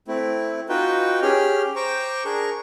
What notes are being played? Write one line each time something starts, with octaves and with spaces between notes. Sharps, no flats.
A3 C4 E4
D#4 F4 F#4 B4 G5
C#4 G4 G#4 G5 F6
C5 G5 A#5 C#6 D6
D4 G#4 A#4 A#5 C#6